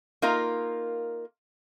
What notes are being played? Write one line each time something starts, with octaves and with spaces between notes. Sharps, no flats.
A#3 D#4 F4 A#4